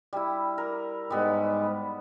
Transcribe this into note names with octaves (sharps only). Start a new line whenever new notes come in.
G3 E4
A#4
G#2 G3 G#3 B3